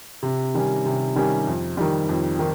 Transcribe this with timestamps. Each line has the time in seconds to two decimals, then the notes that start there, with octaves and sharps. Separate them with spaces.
0.23 C3
0.54 D#3 G3 C#4
0.85 C3
1.16 D#3 G3 C#4
1.47 F2
1.77 D#3 G3
2.09 F2
2.39 D#3